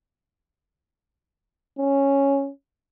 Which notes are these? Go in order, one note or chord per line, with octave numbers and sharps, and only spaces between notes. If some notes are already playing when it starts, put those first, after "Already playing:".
C#4